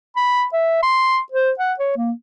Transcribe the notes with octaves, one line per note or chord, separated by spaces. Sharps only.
B5
E5
C6
C5
F#5
C#5
A#3